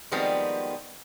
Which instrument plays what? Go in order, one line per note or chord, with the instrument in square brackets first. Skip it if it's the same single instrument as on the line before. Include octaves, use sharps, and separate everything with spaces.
[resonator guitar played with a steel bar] D#3 F3 G3 G#3 B3 C4